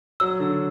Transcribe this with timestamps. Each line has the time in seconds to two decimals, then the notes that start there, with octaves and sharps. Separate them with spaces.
0.20 F#3 E6
0.40 D3